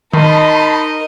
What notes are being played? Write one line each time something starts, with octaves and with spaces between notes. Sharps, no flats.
D#3 D#4 A#4 D#5 A5 B5 C6